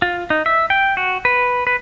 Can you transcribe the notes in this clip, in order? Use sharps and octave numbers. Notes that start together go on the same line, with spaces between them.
F4
D#4
E5
G5
F#4
B4
B4